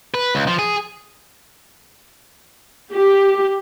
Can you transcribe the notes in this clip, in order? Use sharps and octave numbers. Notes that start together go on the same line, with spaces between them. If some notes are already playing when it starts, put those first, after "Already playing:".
B4
C#2
F3
G#4
G4